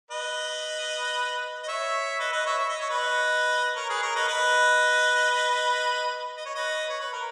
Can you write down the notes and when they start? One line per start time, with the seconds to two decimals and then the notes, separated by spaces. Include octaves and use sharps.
0.11 B4 D#5
1.63 D#5
1.67 C#5 E5
2.20 B4 D#5
2.33 B4 D#5
2.46 C#5 E5
2.58 E5
2.69 D#5
2.80 C#5
2.90 B4 D#5
3.76 A#4 C#5
3.89 G#4 B4
4.02 A#4 C#5
4.16 B4 D#5
4.28 B4 D#5
6.37 D#5
6.45 C#5
6.55 B4 D#5
6.89 C#5
7.00 B4
7.13 A#4